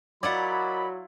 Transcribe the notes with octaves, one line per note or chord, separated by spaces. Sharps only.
F#3 E4 F4 A#4 D5 D#5 F#5 B5